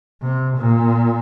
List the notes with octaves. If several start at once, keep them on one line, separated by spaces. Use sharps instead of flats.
C3
A#2